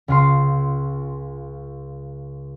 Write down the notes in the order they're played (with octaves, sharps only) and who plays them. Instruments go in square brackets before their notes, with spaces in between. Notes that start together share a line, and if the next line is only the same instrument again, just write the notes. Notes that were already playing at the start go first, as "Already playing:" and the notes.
[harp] C#2 F4 C6